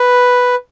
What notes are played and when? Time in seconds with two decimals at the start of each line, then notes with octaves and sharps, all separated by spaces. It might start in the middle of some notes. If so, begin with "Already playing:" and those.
Already playing: B4